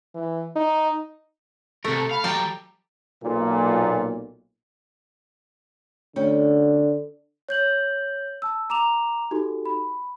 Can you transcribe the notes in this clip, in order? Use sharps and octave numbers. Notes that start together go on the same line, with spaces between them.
E3
D#4
C3 A3 A#4
A5
F5 B5
F#3 G4 G5 A5 A#5
B1 A#2
D2 D3 C#4 G5
C#5 G6 F#7
A5 E6
A#5 D6 E7 F7
D#4 F#4 G4 A4
B5